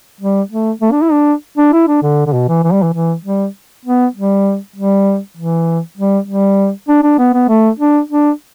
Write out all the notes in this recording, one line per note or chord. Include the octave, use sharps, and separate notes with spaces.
G3
A3
A3
D4
E4
D4
D4
E4
D4
D3
D3
B2
E3
E3
G3
E3
E3
G3
B3
G3
G3
E3
G3
G3
D4
D4
B3
B3
A3
D4
D4